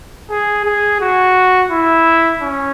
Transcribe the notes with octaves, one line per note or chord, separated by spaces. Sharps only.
G#4
G#4
F#4
E4
C#4